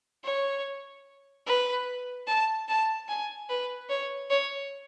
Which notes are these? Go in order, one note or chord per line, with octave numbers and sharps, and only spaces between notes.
C#5
B4
A5
A5
G#5
B4
C#5
C#5